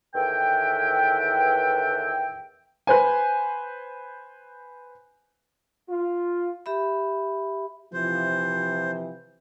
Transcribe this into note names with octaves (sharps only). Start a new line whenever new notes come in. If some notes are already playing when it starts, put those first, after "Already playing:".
E2 A2 D#3 B4 E5 G5
B4 C5 G#5
F4
G4 E5 B5
C3 E3 F3 C5